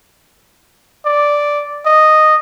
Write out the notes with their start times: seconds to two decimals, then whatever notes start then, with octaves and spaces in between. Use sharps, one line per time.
1.05 D5
1.85 D#5